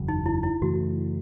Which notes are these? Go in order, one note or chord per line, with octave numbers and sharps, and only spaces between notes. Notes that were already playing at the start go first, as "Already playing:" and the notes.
Already playing: F#1 E2 C#3 F#3
D#4
E4
E4
F#2 C#3 E3 A3 F#4